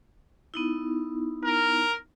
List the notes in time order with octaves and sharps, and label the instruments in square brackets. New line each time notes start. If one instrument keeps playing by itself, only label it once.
[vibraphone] B3 D#4 E4
[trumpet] A#4